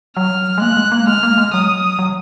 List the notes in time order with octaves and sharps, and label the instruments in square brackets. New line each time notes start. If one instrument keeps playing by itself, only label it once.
[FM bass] F#3 [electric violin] F6
[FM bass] G#3
[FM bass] A#3 [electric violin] F#6
[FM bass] G#3
A#3
[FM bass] G#3 [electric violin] F6
[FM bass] A#3
G#3
[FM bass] F#3 [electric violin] D#6
[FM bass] F#3